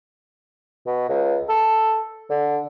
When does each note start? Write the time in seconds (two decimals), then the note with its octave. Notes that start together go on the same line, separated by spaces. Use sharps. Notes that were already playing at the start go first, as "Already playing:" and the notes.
0.87 B2
1.09 C#2
1.49 A4
2.30 D3